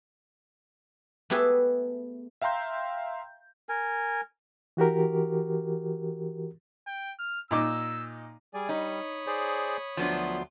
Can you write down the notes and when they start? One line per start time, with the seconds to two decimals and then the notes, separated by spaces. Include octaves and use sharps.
1.30 A3 B3 G4 G#4 B4 E5
2.42 E5 F5 G5 A#5 C6 G6
3.69 A#4 G#5
4.77 E3 F#4 G4 A#4
6.87 G5
7.19 F6
7.51 A#2 D#4 D6 E6
8.54 G3 G#4 D5 G#5
8.69 D#4 C#5 B5 D#6
9.27 G#4 C5 D5
9.97 D2 F3 F#3 B3 D4 C6